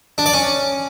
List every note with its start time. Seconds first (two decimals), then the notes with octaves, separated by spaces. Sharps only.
0.18 D4
0.26 D5
0.34 C#4